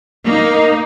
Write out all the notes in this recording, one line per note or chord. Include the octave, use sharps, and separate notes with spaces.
A#3 D#4